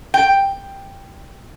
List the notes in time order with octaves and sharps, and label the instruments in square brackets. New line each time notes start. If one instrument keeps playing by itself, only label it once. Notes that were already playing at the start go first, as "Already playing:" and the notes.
[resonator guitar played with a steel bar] G5